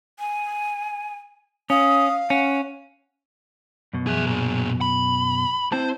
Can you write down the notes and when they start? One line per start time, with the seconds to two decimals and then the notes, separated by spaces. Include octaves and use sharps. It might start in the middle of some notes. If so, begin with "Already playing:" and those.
0.19 G#5
1.70 C#4 F5 D#6
2.30 C#4 F#5
3.93 F#2 B2
4.07 G#4 E5
4.27 A#2 G#4
4.81 B5
5.72 C4 E4 C5 A5